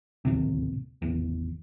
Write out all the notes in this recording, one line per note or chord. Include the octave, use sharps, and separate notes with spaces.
D1 G#1 D#2 C3
G#1 E2